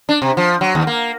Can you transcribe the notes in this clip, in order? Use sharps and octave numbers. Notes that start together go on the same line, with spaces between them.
D4
C3
F3
F#3
D#2
A#3